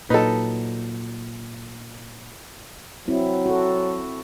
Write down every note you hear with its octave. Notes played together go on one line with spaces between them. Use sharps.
A#2 F#3 D#4 A4 B4 A5
F#3 C4 E4
F#4 A4